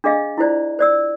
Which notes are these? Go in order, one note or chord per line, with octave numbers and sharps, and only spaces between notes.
D4 G#4 D#5 F5
E4 F4 C5 D5
C5 D5 E6